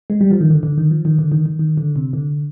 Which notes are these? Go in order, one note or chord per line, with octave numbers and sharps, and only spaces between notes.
G#3
G3
F3
D#3
D3
D3
D#3
F3
D#3
D3
D#3
D#3
D#3
D3
C3
D3